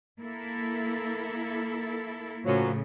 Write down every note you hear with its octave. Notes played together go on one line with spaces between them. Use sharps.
A#3 E4 A4
F#2 A2 C#3 F3 F#3